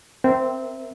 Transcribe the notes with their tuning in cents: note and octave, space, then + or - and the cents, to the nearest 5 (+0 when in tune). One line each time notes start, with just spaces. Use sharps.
C4 -10 A#4 +15 E5 +5